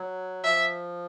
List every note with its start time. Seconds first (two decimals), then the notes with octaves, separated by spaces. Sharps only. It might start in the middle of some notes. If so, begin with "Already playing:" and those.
Already playing: F#3
0.43 F3 E5